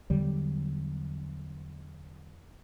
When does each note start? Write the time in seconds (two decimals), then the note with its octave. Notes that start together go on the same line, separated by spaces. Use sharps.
0.10 E2 D3 F#3 G3